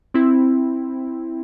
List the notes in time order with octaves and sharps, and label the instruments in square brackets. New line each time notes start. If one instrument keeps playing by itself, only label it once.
[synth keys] C4 E4